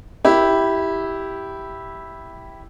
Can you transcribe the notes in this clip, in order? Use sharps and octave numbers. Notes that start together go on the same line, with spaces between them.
E4 G4